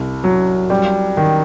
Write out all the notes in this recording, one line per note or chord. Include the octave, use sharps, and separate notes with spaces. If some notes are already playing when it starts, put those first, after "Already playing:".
Already playing: C2
F#3
G3
D#3